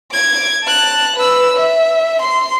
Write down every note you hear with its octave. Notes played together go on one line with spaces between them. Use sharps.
D6 G#6
A5 F#6
B4 E6
E5
C6